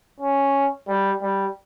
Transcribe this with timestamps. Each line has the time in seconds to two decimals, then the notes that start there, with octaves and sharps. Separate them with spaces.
0.20 C#4
0.88 G3
1.22 G3